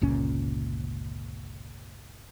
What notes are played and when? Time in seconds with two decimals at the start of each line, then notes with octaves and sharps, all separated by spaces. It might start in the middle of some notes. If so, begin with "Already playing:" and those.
0.01 G1 C#2 A#2 C#4